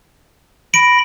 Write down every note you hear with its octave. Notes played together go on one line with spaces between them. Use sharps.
B5 A#6 D7